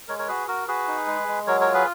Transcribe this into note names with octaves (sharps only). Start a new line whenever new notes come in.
G#3 A#4 C#5
A#4 C#5
F#4 G#4 B4
F#4 A#4
F#4 G#4 B4
D#4
G#3
G#3
F#3 A#4 C#5
A#4 C#5
F4
G#4 B4